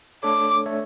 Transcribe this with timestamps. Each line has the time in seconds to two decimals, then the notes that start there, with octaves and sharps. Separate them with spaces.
0.23 A3 D4 A4 C#5 D6
0.66 A3 D4 A4 C#5